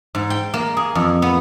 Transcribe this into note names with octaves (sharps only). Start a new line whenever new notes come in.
G#2
G5
A#3
G#4
F2
B3